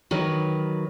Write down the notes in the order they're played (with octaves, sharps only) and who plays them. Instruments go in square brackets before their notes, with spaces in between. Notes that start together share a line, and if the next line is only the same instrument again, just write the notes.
[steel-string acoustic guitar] D#3 F#3 B4